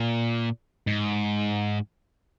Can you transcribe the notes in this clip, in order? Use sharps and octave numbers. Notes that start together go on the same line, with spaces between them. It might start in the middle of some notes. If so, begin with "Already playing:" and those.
Already playing: A#2
G#2